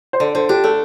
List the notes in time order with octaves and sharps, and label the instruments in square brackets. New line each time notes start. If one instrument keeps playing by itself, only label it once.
[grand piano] C5
[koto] D3 [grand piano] D5
[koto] D3 [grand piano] C5
[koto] D4 [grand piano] G4
[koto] A3 [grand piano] A4